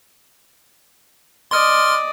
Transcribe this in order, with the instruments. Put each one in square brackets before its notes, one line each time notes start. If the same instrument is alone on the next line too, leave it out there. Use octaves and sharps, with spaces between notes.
[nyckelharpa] D5 D#5 [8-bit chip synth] C6 F6